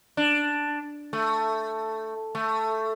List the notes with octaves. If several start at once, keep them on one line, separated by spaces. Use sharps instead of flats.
D4
A3
A3